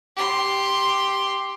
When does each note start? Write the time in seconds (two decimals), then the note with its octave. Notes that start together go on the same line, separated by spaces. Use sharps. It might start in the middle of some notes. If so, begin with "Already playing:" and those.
0.16 G4 C6